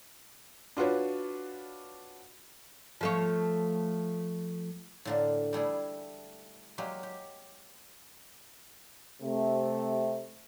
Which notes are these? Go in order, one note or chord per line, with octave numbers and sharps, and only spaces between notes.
D4 F4 F#4 B4 C#5
F3 A3 C#5
A2 D3 A#3
G3 A3 E4 G#4
F#3 G#3 A#3 G4
G4
C3 A3